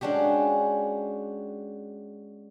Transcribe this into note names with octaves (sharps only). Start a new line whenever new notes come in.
G#3 C#4 D4 F#4 G4